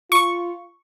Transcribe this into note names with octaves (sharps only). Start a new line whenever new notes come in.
F4 C#6